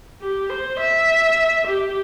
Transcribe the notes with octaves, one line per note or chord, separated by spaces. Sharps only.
G4
C5
E5
G4